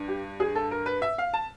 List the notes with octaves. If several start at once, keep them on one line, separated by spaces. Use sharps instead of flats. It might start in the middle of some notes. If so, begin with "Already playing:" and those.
Already playing: G2
G4
G#4
A4
A#4
B4
E5
F5
A5